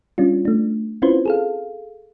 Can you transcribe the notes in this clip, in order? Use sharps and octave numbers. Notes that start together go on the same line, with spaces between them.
G3 C#4 D4 F4
A3 D4
C4 C#4 E4 F4 B4 C5
G#4 A4 F5